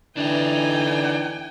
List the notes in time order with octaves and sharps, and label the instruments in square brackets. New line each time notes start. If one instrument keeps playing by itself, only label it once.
[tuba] D3 [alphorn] E3 [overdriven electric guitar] D4 D#4 [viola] G5 G#5